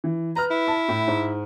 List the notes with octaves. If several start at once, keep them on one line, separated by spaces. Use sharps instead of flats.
E3
B4 A#5 F6
E4
A5
A2
G#2